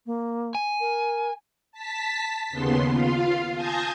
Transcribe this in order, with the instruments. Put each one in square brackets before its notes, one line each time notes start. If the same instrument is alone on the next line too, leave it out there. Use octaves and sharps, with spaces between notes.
[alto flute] A#3
[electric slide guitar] G#5
[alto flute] A#4
[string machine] A5 B6
D#2 C#3 B3 C6
F4 F5
G#5 A5 D#6 G6 G#6 A#6